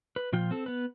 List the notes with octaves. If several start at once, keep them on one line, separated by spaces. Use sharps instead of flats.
B4
A#2 F3 F4 G5
C4 A4
B3 B4